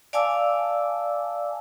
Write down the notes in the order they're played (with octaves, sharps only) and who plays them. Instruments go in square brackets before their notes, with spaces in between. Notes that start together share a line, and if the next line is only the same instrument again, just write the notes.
[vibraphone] D5 F5 G#5 A5 D6 E6